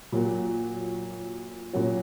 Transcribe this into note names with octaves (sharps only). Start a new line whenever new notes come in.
A#2 F#3 A#3 F#4
A#2 F#3 A#3 C#4 F#4